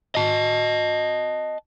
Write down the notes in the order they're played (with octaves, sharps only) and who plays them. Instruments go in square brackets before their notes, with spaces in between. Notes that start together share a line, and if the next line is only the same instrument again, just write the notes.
[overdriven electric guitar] D#5 A5